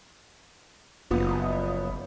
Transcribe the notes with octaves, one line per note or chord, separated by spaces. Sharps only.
F#1 F3 B3 D#6